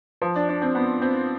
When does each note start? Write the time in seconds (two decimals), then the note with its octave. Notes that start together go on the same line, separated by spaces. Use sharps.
0.22 F3
0.36 D4
0.49 D4
0.62 C4
0.75 B3
1.02 C4